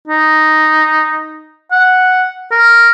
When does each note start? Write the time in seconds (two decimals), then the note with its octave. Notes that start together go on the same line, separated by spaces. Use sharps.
0.08 D#4
1.72 F#5
2.52 A#4